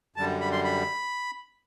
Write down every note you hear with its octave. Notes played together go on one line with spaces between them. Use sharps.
F#2 D3 G3 A5
B5
C6
B5